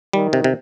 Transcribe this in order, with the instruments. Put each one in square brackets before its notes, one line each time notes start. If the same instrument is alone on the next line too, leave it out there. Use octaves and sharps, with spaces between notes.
[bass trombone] D#3 [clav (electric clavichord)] G3
[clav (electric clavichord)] C3
C3